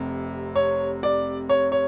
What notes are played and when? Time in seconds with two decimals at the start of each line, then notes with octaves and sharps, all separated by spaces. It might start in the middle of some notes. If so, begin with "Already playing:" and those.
Already playing: F1 C3
0.56 C#5
1.03 D5
1.49 C#5
1.72 C#5